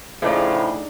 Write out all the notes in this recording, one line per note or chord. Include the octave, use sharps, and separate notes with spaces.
A2 C#3 F3 D4 D#4 G#4